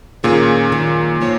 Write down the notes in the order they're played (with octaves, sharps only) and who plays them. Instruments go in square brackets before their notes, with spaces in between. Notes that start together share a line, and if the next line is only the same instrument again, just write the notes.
[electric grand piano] A#2 [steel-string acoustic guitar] D#3 A#3 C#4 G#4 C#5
[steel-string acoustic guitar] F#2 D#3 G#3
F3 A#3 F4 A#4 C#5